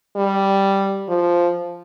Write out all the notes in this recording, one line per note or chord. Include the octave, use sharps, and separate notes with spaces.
G3
F3